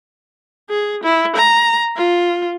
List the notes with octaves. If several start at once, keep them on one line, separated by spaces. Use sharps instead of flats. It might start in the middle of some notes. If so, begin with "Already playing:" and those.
G#4
E4
A#5
F4